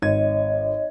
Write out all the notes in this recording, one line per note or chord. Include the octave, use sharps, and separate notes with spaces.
G#1 C#5 D#5 G#6